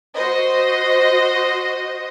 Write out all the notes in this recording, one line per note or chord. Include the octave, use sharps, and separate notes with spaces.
F#4 C5 D#5